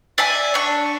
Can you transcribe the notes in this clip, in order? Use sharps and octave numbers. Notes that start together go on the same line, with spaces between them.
D5 E5 G#5
D4 C#6